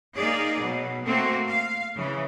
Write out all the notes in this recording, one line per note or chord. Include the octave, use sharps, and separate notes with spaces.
A#3 D#4 G#4 D5
B2 F#3
A3 A#3 C4 F#4
F5
C#3 E3